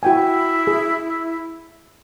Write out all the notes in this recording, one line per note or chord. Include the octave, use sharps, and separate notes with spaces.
E4 F#4 G5 G#5
G#4